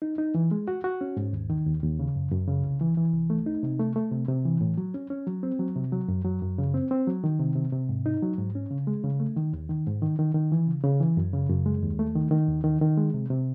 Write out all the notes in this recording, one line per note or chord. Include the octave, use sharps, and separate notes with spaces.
D#4
D#4
E3
G#3
F#4
F#4
C#4
G#2
D#2
D#3
D#2
D#2
C#3
F#2
F#2
C#3
C2
E3
E3
C2
A3
D#4
C3
A3
A3
C3
C3
E3
A2
F#3
C#4
C#4
F#3
C4
F#3
C3
F#3
F#2
F#3
F#2
C#3
C4
C4
F#3
D#3
C3
C3
C3
G#2
D#4
F#3
G#2
C#4
C#3
G#3
C#3
A3
D#3
D#2
D#3
G#2
D#3
D#3
D#3
E3
C#3
C#3
E3
F#2
C#3
F#2
G#3
D#2
A3
D#3
D#3
D#2
D#3
D#3
G#3
C3
C3